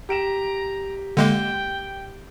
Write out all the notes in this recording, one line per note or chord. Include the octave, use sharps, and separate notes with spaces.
G4 A#5 D7 E7
D3 G#3 A#3 G5